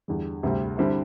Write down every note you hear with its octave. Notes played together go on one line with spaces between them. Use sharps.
E2 D3 G3
D2 C3 G3 C4
D3 G3 C4 E4